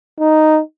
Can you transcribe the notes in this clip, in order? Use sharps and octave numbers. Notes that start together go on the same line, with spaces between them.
D#4